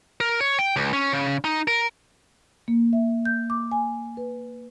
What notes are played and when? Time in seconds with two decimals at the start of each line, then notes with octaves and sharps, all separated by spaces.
0.20 A#4
0.41 C#5
0.59 G5
0.76 C#2
0.93 C#4
1.13 C#3
1.44 D#4
1.68 A#4
2.68 A#3
2.93 E5
3.25 G6
3.50 D6
3.71 G#5
4.17 B4